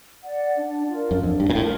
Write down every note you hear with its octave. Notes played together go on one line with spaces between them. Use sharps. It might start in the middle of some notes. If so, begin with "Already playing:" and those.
D5 F#5
D4
F4 A#4
F#2
F2 D4
G2
A#2
A2 F4 A#4